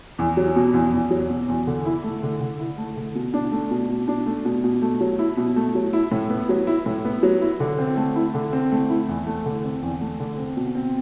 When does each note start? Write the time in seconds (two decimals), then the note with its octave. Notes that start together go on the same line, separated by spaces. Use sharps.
0.19 E2
0.37 F#3
0.56 B2
0.74 E2
0.93 E2
1.11 F#3
1.30 B2
1.49 E2
1.67 D3
1.85 E4
2.04 A3
2.23 D3
2.41 D3
2.60 E4
2.78 A3
2.97 D3
3.15 B2
3.34 D4
3.52 A3
3.71 B2
3.89 B2
4.08 D4
4.26 A3
4.45 B2
4.64 B2
4.82 A3
5.00 F#3
5.19 E4
5.37 B2
5.56 A3
5.75 F#3
5.93 E4
6.12 A2
6.30 B3
6.49 F#3
6.67 E4
6.86 A2
7.05 B3
7.23 F#3
7.41 E4
7.60 D3
7.78 C4
7.97 A3
8.16 E4
8.34 D3
8.53 C4
8.72 A3
8.90 E4
9.08 E2
9.27 A3
9.45 D3
9.64 C4
9.82 E2
10.01 A3
10.20 D3
10.38 C4
10.57 B2
10.75 C4